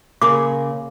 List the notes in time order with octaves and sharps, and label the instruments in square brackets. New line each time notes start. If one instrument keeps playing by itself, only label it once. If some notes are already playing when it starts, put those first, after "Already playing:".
[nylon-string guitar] C#3 G#4 A#4 [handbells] A#3 [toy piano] D6